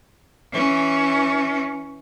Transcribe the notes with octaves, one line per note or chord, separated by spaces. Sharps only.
E3 C#4